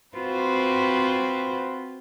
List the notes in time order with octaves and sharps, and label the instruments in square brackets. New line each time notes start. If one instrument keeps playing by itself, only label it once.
[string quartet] C4 F4 F#4 B4 C5